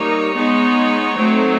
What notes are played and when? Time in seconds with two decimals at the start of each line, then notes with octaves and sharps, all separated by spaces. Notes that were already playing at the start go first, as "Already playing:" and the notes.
Already playing: G3 A#3 D#4 C#5
0.34 G#3 B3 D#4
1.15 F#3 A3 C4 D#4